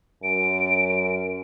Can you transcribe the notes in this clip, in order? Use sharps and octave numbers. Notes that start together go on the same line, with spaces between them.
F#2 D7